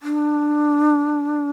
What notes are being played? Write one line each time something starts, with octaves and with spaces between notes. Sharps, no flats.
D4